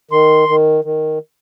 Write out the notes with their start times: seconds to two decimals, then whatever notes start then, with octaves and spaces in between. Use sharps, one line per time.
0.11 D#3 C6
0.49 D#3
0.84 D#3